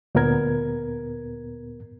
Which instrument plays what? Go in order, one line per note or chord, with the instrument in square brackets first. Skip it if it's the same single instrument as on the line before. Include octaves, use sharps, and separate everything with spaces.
[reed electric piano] D2 A#2 B3 A#4 G#6